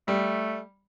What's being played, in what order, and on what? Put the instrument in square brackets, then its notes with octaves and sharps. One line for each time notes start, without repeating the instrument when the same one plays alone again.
[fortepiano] G3 [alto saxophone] A3